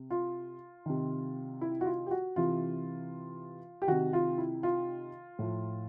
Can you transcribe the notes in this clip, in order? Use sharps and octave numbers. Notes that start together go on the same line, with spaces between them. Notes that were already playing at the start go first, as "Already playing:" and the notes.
Already playing: C3
F4
C3 D#3
E4
F#4
F4
G4
F#4
C3 E3 F4
G4
C3 D#3 F#4
F4
E4
F4
A2 F3